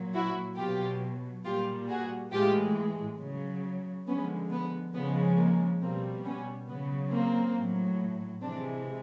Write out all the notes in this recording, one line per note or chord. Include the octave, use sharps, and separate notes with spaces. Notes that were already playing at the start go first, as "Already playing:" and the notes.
Already playing: A#2 F#3
E4 F#4
B2 F#3 F4 G4
A#2 G3 F4 G4
F#4 G#4
A2 E3 G#3 F4 G4
C#3 F#3
D3 F3 G#3 B3 C#4
B3
C#3 F3 G#3 B3
A#3
B2 G3 A#3 C4
B3 C#4
C#3 F#3 B3
A#3 C4
A2 F#3
C3 E3 G#3 C4 D4